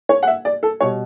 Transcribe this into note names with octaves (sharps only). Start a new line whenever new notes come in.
C#5
F#5
E5
D5
A4
B2 G3 C#5